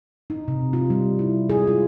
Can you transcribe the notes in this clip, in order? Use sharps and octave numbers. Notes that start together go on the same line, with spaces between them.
D#4
C3
F4
G3
E4
G#4
F4